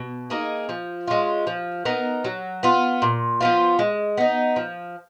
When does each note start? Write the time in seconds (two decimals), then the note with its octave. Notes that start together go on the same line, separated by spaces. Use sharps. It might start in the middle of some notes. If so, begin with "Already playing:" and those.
Already playing: B2
0.30 A#3 D#4 G#4
0.69 F3
1.07 G#3 C#4 F4
1.47 F3
1.85 B3 D#4 A#4
2.25 F#3
2.63 B3 F4
3.02 A#2
3.41 F3 B3 F4
3.79 G#3
4.17 B3 D#4
4.56 F3